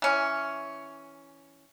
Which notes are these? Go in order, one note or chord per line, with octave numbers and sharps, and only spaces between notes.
E3 C#4